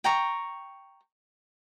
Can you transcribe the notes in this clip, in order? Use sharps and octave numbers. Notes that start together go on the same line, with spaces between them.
G5 A#5 C#6